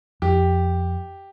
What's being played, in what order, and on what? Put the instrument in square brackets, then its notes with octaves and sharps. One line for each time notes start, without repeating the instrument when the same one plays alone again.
[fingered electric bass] F2 [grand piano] G4